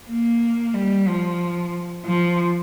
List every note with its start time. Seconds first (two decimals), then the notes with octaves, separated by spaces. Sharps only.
0.10 A#3
0.74 G3
1.08 F3
2.05 F3